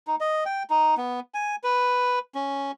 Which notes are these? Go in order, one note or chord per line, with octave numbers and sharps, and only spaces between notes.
D#4
D#5
G5
D#4
B3
G#5
B4
C#4